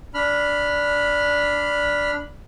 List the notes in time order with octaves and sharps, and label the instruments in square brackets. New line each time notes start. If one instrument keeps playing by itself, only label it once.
[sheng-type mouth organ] D4 B5 F6